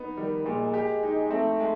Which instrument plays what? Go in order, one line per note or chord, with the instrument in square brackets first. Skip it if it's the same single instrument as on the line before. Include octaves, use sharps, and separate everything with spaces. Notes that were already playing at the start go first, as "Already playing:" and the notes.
Already playing: [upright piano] B3 D#4
[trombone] D#3 [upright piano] G3
[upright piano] A#2 [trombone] G#3
[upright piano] G4
D#4
[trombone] A3 [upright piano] C4
[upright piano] G#3